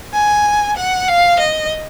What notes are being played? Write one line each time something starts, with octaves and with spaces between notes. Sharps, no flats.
G#5
F#5
F5
D#5